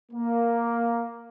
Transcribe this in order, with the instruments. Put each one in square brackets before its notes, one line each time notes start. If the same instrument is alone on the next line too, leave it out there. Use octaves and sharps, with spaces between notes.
[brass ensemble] A#3